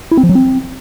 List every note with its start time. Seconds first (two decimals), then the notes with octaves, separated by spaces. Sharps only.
0.11 E4
0.17 C4
0.23 F3
0.29 F#3
0.35 C4